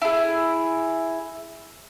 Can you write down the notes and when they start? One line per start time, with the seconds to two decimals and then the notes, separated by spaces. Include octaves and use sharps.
0.02 E4 G#4